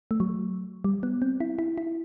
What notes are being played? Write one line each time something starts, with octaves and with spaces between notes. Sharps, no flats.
A3
F#3
G3
B3
C4
E4
E4
E4